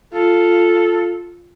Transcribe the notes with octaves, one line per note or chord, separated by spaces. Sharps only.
F4 A4